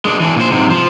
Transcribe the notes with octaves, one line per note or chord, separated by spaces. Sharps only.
G#3 D4
E3 D4
A#2 C5
G#2 C3
F3